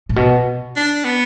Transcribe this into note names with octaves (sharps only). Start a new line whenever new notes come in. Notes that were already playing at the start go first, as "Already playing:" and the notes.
A2
B2
D4
B3